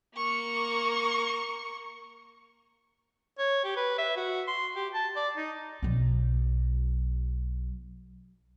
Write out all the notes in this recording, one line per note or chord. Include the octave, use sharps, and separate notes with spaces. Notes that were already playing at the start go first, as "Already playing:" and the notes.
A#3 C#6
C#5
G4
B4
E5
F#4
C6
G4
A5
D5
D#4
B1 F#3